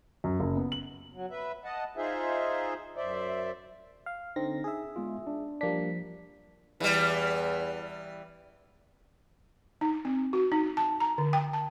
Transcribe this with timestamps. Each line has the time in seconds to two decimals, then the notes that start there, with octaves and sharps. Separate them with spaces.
0.24 F#2
0.40 F#1
0.57 B3
0.72 F#7
1.14 F#3
1.31 B4 E5
1.64 D#5 F#5 A5
1.97 D#4 F4 G#4 C5 E5
2.97 F#2 C5 D5 E5
4.06 F5
4.36 D3 C4 D#4 A#6
4.64 G#4 E5
4.96 G#3 B3 F4
5.27 D4
5.61 F3 G3 A#3 D4 B6
6.80 E2 E3 G3
9.81 D#4
10.05 C4
10.33 F#4
10.52 D#4
10.77 A5
11.00 A#5
11.18 D3
11.33 G5
11.53 A5